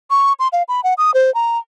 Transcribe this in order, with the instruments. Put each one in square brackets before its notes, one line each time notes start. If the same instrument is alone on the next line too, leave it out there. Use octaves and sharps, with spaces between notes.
[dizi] C#6
C6
F5
B5
F#5
D#6
C5
A#5